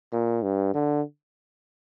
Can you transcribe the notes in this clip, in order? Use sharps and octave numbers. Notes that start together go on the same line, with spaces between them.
A#2
G2
D3